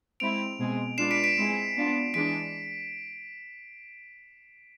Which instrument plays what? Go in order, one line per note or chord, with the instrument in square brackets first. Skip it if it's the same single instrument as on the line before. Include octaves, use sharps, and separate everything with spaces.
[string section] G#3 C4 E4 [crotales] D7 F7
[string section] B2 G#3 C4 G#4
[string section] G#3 D4 F4 B4 D5 [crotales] C7 E7
[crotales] B6 D7
B6 D7
[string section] G#3 C4 E4 G#4
B3 D4 F4
[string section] E3 G#3 D4 [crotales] B6 D7